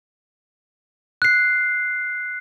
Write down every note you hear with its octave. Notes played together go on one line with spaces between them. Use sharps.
F#6 C7